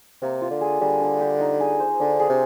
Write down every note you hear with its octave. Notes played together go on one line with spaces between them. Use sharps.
C3 A#3
F4
D3
G#4
D3 G3
D4
G4
D#4
G#4
C5
D3 D4
G#4
C3